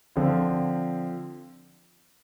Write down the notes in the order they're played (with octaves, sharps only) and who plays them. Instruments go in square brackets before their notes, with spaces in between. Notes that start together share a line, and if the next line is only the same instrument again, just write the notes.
[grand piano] D3 F3 C4 F4